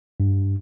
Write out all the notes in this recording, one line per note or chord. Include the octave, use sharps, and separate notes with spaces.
G2